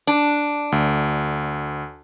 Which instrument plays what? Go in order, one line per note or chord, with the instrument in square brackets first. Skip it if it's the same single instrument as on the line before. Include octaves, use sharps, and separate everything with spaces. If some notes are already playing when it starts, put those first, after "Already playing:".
[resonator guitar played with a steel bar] D4
[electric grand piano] D2